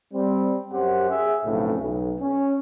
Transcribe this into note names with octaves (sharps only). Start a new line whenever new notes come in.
G3 C4
F#2 C#4 G4 C5 F#5
G#4 E5
B1 F2 A2 C#3
B1
C#4